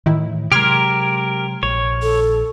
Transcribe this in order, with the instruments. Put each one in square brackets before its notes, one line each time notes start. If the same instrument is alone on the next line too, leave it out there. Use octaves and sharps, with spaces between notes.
[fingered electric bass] A2 E3 [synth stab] D#3 E4
[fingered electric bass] C3 F#3 G#3 [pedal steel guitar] G4 A#4 [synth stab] C6 F6 G#6
[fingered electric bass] A#1 [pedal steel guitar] C#5
[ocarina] A4